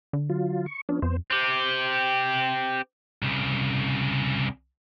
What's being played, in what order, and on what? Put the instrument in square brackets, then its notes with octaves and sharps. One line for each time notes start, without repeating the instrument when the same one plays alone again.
[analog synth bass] D3
[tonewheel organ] F#3 F4
C#6
[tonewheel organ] F3 B3 C#4 [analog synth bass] D4
[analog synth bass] F2 [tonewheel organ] B3 C5
[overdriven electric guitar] C4 G4
[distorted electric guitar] C2 C#3